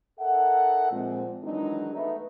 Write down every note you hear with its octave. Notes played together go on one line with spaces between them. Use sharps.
D#4 A4 A#4 E5 F#5
A#2 F3 G#3 C4
D#3 E3 F#3 G#3 D4 D#4
A3 B3 D#4 B4 E5